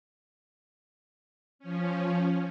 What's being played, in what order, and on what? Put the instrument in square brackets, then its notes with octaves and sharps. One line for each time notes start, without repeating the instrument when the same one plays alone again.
[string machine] F3 C#4